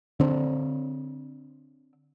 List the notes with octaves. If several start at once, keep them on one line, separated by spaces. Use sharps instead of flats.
D3 C4 D4